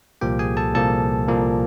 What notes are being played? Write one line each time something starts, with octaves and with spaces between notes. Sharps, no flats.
C2 A#2 F3 A#3 G4 G5
G#4 G#5
A4 A5
C2 A#2 F3 A#3 A4 A5
C2 A#2 F3 A#3